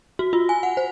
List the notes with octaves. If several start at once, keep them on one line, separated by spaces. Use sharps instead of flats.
F#4
F4
G#5
F#5
C5